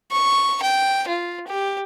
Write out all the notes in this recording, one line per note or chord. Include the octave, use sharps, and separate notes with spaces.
C#6
G5
F4
G4